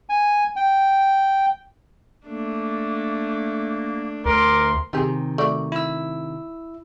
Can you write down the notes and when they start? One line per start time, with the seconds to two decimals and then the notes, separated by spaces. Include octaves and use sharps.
0.09 G#5
0.56 G5
2.26 A3 A#3 D4
4.26 D2 A#4 C6 D6
4.93 C3 D#3 C4 G4 G#4
5.38 A3 F#4 D5
5.72 E4 E6